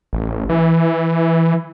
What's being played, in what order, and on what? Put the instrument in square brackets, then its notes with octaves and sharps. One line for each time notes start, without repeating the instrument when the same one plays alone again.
[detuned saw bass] A1
E3